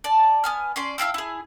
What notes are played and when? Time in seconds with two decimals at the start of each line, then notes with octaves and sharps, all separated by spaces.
0.04 D5 A5
0.44 B3 G#5 F6
0.76 C#4 D5 C6
0.98 E4 F5 G5 E6
1.14 E4 G#4